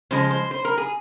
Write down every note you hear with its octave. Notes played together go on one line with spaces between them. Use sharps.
C#3 F3 G#3 C5
C5
C5
A#4
G#4